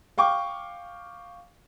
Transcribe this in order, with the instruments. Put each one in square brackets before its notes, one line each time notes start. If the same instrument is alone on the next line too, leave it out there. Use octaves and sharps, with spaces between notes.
[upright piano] F5 G5 C#6 D6